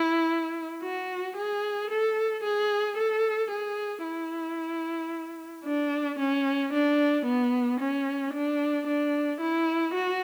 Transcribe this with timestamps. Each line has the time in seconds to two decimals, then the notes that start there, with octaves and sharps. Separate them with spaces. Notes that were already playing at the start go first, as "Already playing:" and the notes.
Already playing: E4
0.82 F#4
1.36 G#4
1.90 A4
2.44 G#4
2.97 A4
3.50 G#4
4.04 E4
5.65 D4
6.19 C#4
6.73 D4
7.25 B3
7.79 C#4
8.34 D4
8.87 D4
9.41 E4
9.93 F#4